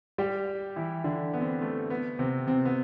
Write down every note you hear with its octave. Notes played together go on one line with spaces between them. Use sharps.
G3 G4
E3 E4
D3 D4
B3
C4
B3
A3
B3
C3 C4
C3 C4
B3